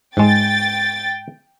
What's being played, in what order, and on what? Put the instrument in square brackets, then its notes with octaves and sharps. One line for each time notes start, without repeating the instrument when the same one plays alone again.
[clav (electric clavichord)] G#2 G#3 [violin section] G5 A6